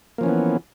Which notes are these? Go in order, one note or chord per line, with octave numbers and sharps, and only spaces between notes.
E3 F3 A#3 B3 C#4